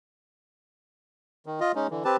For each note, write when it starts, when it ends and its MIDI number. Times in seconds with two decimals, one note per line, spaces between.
1.46 1.60 51
1.60 1.72 65
1.60 1.72 75
1.75 1.87 56
1.75 1.87 61
1.75 1.87 63
1.90 2.04 50
1.90 2.04 52
2.05 2.17 60
2.05 2.17 67
2.05 2.17 71
2.05 2.17 81